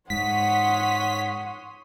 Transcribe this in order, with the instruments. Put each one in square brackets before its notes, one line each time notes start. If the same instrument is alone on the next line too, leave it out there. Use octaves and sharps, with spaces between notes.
[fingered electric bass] G#2 [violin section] C#5 C6 D#6 [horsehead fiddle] F#5 [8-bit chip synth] B6